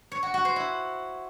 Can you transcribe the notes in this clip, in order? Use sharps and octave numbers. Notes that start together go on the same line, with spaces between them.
C#5
F#4
F#4
C5
E4